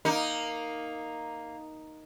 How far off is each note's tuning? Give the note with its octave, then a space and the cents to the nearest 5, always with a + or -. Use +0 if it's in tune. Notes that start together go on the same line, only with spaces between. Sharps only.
A#3 +0 D#4 +0 A#4 +0